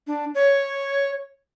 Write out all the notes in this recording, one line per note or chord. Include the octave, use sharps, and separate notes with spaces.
D4
C#5